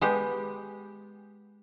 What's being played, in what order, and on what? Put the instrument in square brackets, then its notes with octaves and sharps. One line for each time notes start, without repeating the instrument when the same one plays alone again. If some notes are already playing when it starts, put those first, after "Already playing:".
[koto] G#3 B3 G4